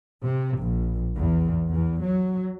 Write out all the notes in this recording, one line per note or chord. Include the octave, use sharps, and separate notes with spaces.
C3
A#1
E2
E2
F#3